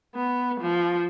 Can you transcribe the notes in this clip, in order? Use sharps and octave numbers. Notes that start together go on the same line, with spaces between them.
B3
F3